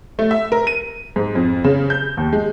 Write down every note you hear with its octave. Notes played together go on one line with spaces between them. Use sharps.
A3
E5
A#4
D#7
G#2
F2
C#3
G6
D#2
G#3